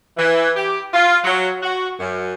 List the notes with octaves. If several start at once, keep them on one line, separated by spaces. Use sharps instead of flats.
E3
G4
F4
F#3
F#4
F#2